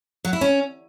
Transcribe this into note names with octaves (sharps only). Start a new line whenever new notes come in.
F#3
E4
C#4